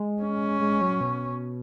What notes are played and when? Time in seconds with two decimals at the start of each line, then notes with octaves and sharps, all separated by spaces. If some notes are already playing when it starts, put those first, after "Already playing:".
Already playing: G#3
0.22 C#4
0.61 G#3
0.81 F#3
1.01 B2